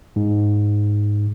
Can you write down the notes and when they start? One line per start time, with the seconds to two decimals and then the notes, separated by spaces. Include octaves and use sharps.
0.16 G#2